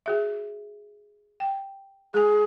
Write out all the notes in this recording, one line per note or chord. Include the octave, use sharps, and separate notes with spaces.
F#4 G#4 E5
G5
G#3 G#4 G#5